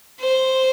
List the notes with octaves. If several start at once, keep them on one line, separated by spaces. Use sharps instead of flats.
C5